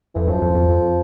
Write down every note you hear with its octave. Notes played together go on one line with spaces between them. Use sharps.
F2 E3
F#2 F3
F2
F2
F2